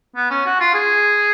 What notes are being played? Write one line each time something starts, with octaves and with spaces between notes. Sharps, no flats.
B3
C#4
F#4
F4
G#4